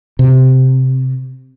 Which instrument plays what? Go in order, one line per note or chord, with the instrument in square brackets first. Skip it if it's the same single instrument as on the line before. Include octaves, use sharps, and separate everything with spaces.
[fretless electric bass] C3